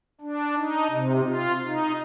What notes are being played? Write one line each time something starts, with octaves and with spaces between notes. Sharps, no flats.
D4
D#4
C3
F4
D#4